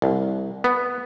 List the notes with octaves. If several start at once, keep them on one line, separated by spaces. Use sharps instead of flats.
C2
B3